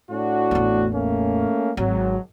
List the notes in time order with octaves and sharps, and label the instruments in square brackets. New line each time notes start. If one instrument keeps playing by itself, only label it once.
[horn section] A2 D4 F#4
[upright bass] A1 E2
[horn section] A3 A#3 C#4
[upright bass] G#1 [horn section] F#3